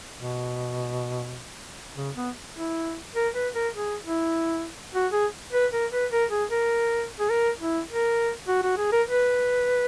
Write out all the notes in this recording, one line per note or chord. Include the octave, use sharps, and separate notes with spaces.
B2
C#3
B3
E4
A#4
B4
A#4
G#4
E4
F#4
G#4
B4
A#4
B4
A#4
G#4
A#4
G#4
A#4
E4
A#4
F#4
F#4
G#4
A#4
B4